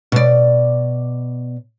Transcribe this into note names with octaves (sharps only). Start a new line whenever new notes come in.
B2 D5